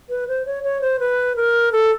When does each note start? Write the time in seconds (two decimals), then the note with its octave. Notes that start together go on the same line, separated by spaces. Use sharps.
0.10 B4
0.28 C5
0.46 C#5
0.63 C#5
0.81 C5
0.99 B4
1.36 A#4
1.72 A4